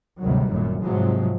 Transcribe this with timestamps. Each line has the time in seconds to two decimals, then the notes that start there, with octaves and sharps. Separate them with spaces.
0.20 G#1 D2 C3 D#3 F#3 G3
0.50 G1 F#2 A#2
0.82 G#2 C3 F3 F#3 G#3